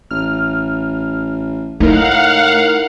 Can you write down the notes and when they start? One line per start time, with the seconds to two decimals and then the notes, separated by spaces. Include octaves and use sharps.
0.11 A1 F6
1.80 A2 A3 D#4 E4 A#4 F5 F#5